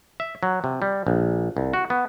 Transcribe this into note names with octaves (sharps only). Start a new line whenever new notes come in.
E5
F#3
C3
G3
A#1
C2
F#4
B3